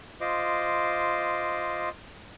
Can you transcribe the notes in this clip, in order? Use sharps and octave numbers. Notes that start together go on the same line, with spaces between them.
F4 C5 D#5 D6